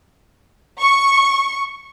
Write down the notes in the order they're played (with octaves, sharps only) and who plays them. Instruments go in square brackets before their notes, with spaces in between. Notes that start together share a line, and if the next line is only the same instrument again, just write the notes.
[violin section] C#6